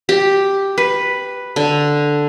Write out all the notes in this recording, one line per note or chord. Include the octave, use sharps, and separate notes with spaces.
G4
B4
D3